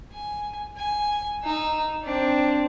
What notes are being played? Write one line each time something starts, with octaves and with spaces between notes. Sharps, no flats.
G#5
G#5
D#4 E6
C4 D4